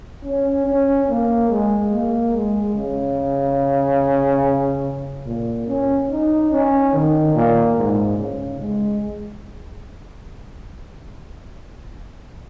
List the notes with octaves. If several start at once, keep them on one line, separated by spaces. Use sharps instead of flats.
C#4
C#4
A#3
G#3
A#3
G#3
C#3
A#2
C#4
D#4
C#4
D#3
A#2
G#2
C#3
G#3